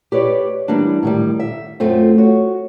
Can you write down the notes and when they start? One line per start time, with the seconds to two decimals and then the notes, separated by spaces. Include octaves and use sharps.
0.12 G4 B4 C#5 D5
0.68 E3 G3 A#3 D4
1.03 A2 D#3 G3
1.40 E5
1.80 F#2 A3 C4 F4
2.18 F#4 C#5